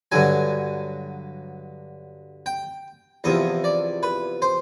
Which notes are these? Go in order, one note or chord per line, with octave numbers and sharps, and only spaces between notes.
G2 D3 F#3 G#5
G5
E2 C3 F3 D#5
D5
B4
C5